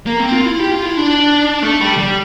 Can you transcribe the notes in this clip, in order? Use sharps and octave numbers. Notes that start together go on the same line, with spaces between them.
A#3
C4
F4
E4
G4
F4
E4
D4
A3
G3
G3